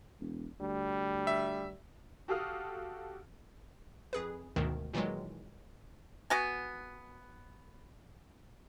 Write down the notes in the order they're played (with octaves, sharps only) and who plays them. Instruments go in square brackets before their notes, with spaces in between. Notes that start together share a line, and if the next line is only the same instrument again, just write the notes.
[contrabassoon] E1
[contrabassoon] D2 [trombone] G3
[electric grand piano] E5
[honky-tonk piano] F#4 G4 A4 F5 D#6 F6
[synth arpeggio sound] F2 G#4 B4
D2 G#2 B2 D#3
A#2 D#3 E3 F#3 G#3
[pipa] B3 F#4 G#5